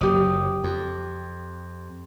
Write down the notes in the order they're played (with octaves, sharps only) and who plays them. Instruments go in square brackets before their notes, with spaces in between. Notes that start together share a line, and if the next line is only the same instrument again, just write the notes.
[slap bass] F#1 F#3 [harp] G4 D#6
[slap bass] F2